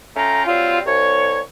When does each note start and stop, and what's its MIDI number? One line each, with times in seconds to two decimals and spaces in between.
0.16 0.43 57
0.16 0.43 61
0.16 0.43 65
0.16 0.43 79
0.16 0.43 82
0.47 0.80 54
0.47 0.80 55
0.47 0.80 60
0.47 0.80 65
0.86 1.40 36
0.86 1.40 73